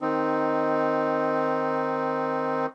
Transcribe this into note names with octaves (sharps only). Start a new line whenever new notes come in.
D#3 C4 D#4